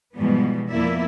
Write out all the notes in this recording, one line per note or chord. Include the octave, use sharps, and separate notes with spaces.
G#2 B2 E3 F3 G3 B3
F2 A#3 B3 E4 D5 E5